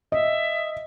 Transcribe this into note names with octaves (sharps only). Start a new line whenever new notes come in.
D#5 E5